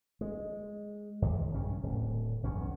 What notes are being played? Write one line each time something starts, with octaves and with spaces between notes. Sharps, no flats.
G#3
D#2
A#1 G2 C#3 C#4
D1
B1 E2 G2 C#4